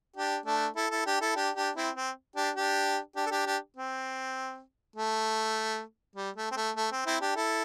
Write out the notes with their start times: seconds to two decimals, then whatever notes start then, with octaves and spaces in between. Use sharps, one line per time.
0.16 D4 G4
0.46 A3 D4
0.76 E4 A4
0.91 E4 A4
1.06 D4 G4
1.21 E4 A4
1.36 D4 G4
1.56 D4 G4
1.76 C4 E4
1.96 C4
2.36 D4 G4
2.56 D4 G4
3.16 D4 G4
3.26 A4
3.31 D4 G4
3.46 D4 G4
3.77 C4
4.96 A3
6.16 G3
6.36 A3
6.51 C4
6.56 A3
6.76 A3
6.92 C4
7.06 C4 E4
7.21 D4 G4
7.36 E4 A4